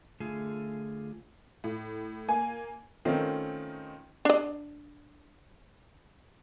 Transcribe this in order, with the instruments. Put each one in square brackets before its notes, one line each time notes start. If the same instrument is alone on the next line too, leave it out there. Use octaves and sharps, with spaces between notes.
[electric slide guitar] D3 A3 F4 G#4
[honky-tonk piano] A2
A#3 G#5
[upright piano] D#3 A3 C4 C#4 D#4 F4
[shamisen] D4 D5